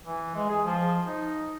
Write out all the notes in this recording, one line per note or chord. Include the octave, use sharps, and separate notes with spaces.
E3
G#3
G#4
F3
D#4